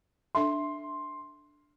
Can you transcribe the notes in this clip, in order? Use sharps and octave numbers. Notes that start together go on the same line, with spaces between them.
D4 A4 E5 C6